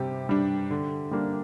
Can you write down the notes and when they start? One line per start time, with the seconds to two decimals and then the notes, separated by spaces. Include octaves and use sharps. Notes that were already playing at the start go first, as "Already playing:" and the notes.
Already playing: C3 G3 G4
0.29 G3 D4
0.70 D3
1.11 G3 A#3 D4